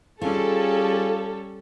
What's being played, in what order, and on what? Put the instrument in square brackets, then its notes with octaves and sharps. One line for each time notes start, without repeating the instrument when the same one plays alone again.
[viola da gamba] G3 C#4 [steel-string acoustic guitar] F4 [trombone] G#4 [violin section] A4